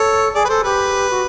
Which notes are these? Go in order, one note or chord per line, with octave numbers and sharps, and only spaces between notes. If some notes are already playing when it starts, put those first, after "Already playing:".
Already playing: A4 C#5
G#4 D5
B4
A4 C5
G4 B4
F#4